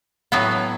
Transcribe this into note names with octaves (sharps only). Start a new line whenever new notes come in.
A2 F#3 B3